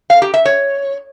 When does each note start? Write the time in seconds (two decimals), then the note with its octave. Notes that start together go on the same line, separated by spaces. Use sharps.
0.10 F5
0.22 G4
0.34 E5
0.45 C#5